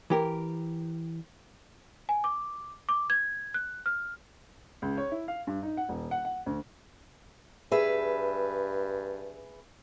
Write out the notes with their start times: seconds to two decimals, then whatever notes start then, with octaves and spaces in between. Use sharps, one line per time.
0.10 E3 G4 A#4
2.09 G#5
2.24 D6
2.89 D6
3.10 G#6
3.54 F#6
3.86 F6
4.82 C#2
4.97 C#5
5.11 E4
5.28 F5
5.47 G2
5.63 D#4
5.77 F#5
5.89 D#1
6.11 F#5
6.25 F#5
6.46 D2
7.72 G2 G#4 B4 E5